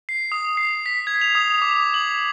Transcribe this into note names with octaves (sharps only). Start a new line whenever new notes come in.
C7
D#6
C7
B6
G#6
F7
D#6
D6
D#6
F#7